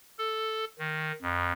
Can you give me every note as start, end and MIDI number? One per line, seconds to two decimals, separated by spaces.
0.18 0.65 69
0.79 1.12 51
1.22 1.52 41